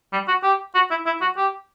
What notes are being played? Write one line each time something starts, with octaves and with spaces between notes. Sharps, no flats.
G3
F#4
G4
F#4
E4
E4
F#4
G4